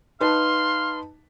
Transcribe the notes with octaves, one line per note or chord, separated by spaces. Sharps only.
D#4 B4 F5 A5 C6